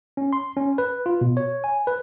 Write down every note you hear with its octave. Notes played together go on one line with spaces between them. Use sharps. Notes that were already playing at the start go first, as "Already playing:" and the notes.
C#4
C6
C#4
B4
F4
B2
C#5
G#5
B4